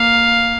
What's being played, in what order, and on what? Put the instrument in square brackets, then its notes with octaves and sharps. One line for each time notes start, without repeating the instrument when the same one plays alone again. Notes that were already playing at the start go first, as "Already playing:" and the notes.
Already playing: [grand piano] A#3 [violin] F5